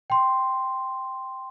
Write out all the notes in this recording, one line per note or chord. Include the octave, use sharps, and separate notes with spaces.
G5 C6